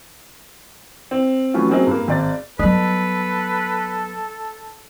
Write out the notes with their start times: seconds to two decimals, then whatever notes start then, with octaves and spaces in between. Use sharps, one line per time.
1.11 C4
1.54 E3 F#3 A3 C#4 F4
1.69 F#3 A#3 C4 G#4 D#5
1.87 G2 A#3
2.08 G#1 D5 A6
2.59 F#3 G3 B3 A4 B4